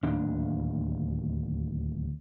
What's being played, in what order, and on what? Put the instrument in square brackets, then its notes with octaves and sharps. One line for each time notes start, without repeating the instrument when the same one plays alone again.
[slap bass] D1 D#2 D4